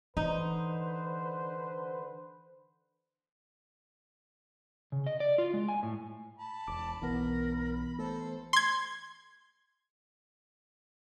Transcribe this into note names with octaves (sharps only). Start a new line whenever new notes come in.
D3 E3 D#4 B4 C5
C#3
D#5
D5
F4
G#3
G#5
A2
A5 B5
E1 D6
B1 E3 B3 A#4
A3 A4 C5
C6 G#6